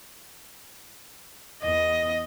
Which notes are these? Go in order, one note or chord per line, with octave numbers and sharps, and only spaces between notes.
E2 D#5